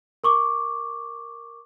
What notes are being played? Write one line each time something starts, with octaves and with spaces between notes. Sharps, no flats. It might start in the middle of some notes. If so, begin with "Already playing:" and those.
A#4 C#6 D6